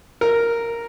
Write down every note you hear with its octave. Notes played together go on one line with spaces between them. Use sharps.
A#4